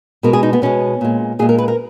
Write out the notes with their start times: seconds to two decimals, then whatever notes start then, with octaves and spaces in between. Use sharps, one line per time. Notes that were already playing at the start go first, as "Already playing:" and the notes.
0.23 B2 G#3 A#4
0.33 G#4
0.43 D#4
0.53 B3
0.62 B2 G#3 C#4
1.01 A#2 G#3
1.39 A#2 G#4
1.42 G#3
1.49 A#4
1.58 B4
1.68 A#4